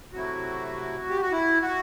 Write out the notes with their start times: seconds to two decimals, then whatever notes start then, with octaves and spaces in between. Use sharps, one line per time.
0.13 C3 F#3 A3 E4 F#4
1.10 G4
1.21 F#4
1.32 E4
1.62 F#4